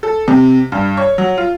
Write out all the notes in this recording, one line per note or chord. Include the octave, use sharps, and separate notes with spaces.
A4
C3
G2
C#5
F#3
F4